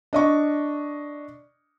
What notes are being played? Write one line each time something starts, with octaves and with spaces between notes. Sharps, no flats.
D4 D#5 C#6